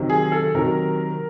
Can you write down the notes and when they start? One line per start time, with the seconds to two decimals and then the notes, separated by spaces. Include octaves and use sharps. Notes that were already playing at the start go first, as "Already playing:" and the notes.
Already playing: C3 D#3 F#3
0.10 G#4
0.32 A4
0.54 C3 D#3 F#3 A#4